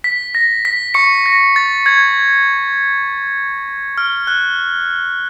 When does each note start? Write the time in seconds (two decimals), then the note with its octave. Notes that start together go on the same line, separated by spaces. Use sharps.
0.04 B6
0.35 A#6
0.65 B6
0.94 C#6 C#7
1.26 A#6
1.56 A6
1.86 G#6
3.98 F6
4.27 F#6